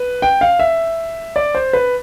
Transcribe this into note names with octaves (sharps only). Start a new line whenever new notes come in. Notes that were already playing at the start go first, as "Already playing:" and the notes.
Already playing: B4
G5
F5
E5
D5
C5
B4